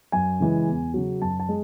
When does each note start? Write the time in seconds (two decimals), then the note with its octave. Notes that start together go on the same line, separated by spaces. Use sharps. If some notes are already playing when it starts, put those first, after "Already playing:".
0.12 F#2 G#5
0.40 C#3 E3 G#3
0.68 E2
0.94 C#3 F#3
1.22 F#2 A5
1.40 A5
1.49 G#3